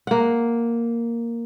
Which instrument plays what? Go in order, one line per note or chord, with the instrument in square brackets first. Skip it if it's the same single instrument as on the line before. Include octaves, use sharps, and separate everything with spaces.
[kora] A#3 F#5